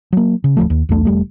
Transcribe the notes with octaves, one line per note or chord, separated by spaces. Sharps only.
F#3 A#3
C#3
D#1 A#1 F3 A3
D#2
B1 E2 A3 D4
F1 G3 A3